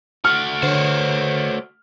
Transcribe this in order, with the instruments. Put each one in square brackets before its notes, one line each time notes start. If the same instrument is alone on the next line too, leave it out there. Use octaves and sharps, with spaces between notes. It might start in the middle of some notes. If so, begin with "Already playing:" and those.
[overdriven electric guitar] A3 F#4 [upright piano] F6
[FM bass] D3 [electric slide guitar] C5 C#5